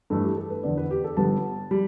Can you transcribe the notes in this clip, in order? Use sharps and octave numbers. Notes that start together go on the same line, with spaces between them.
G2 E3 A3 A4
G4
A4
B4
E2 D3 B3 D5
B4
G4
A4
G1 G2 G3 B3 A5
G3